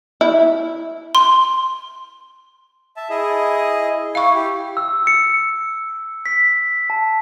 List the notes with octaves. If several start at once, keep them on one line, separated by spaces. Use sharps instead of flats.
E4
C6
E5 A5
E4 G#4 D#5
E4 F5 C#6
G4
E6
C#7
B6
A5